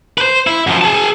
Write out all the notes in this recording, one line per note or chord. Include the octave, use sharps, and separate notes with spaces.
B4 C5
E4
F#2 F3
G#4 A5